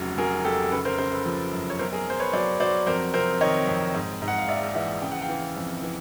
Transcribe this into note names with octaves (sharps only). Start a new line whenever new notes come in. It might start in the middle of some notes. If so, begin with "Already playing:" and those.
Already playing: F1 C#3 F#3
F#3 G#4 A#4
F1 G4 A4
C#3 A4 B4
A#4 C5
C#3 A#4 C5
A4 B4
F3
F#2
C#5
B1 A#4 C5
G#4 A#4
B1 C5
B4 C#5
F#3 C5 D5
F#3 C5 D5
F2 A#4 C5
C3 A#4 C5
D#3 C#5 D#5
F2
G#2
G#2
F#5
F5
A#1 D5 E5
E3 E5 F#5
C#3 G5
F#5
F5 G5
E3
F2
E3